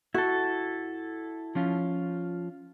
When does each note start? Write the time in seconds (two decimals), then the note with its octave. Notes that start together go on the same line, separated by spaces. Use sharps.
0.14 E4 F#4 A4
1.55 F3 C#4 F4